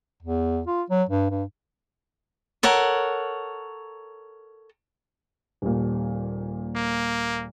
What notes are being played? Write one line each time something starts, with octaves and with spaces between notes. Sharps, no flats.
E2
F4
F#3
G2
G2
A4 A#4 C#5 F#5
D#1 A#2
A#3